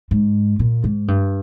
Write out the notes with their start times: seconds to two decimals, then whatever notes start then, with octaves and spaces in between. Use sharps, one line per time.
0.11 G#2
0.59 A#2
0.84 G#2
1.08 G2